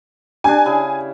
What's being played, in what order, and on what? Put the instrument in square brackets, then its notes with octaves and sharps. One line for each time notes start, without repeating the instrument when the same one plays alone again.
[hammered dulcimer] D4 G4 [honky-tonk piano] G#5
[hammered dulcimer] C#3 E4 G#4